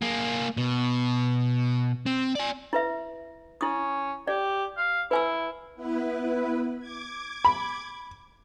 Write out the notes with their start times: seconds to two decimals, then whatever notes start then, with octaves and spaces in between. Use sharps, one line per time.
0.02 A#3 G#4
0.57 B2
2.06 C4
2.35 D5 G#5
2.73 E4 B4 E5
3.61 C#4 E4 D#6
4.27 G4 D5
4.77 F5
5.11 E4 B4 G#5 E6
5.76 B3 E4 B4
6.79 D6 G#6
7.45 B5